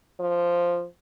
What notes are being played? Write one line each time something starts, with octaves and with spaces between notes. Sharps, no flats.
F3